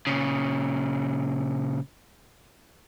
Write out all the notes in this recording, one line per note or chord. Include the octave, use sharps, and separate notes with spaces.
A#2 C#3